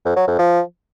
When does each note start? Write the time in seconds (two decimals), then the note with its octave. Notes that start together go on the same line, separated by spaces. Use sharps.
0.05 F2
0.16 F#3
0.28 F2
0.39 F3